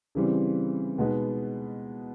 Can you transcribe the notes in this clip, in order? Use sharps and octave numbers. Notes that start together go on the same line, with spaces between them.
C#3 E3 G3 C4
B2 G#3 B3 D#4